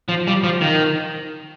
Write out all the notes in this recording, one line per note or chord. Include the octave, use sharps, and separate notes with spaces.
F3
G3
F3
D#3